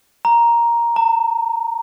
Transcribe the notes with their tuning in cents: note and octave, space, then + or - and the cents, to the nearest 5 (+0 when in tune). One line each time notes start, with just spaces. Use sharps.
A#5 +5
A#5 -45